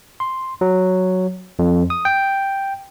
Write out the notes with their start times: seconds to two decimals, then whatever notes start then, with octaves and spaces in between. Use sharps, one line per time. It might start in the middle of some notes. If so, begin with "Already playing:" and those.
0.20 C6
0.61 F#3
1.59 F2
1.90 D#6
2.05 G5